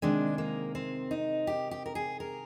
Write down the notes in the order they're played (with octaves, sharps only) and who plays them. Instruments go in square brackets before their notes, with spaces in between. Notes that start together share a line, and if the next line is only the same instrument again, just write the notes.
[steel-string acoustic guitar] C3 D#3 G#3 D4
A#3
C4
D#4
G4
G4
A#4
G#4
A#4